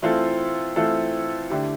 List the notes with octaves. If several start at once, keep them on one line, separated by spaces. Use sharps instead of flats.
E3 A3 C4 F4 A4
E3 A3 C4 F4 A4
D3 A3 E4 G4